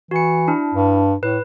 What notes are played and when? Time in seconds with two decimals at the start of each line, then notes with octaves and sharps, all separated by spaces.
0.11 E3 F#4 C#7
0.48 D4 E4
0.75 G2
1.23 A2 B4